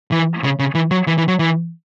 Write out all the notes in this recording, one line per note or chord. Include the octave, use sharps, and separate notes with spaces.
E3
C#3
C#3
E3
F#3
E3
E3
F#3
E3